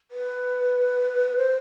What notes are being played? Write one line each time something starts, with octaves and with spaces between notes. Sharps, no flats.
B4
C5